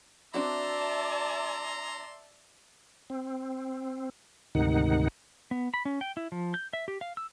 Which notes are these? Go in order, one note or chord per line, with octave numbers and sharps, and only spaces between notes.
C4 D4 F#4 D5 E5 A5 A#5 C6
C4
D2 G#2 C3 D#3 D#4 F#5
B3
B5
C#4
G5
E4
F3
G6
E5
G4
F5
E6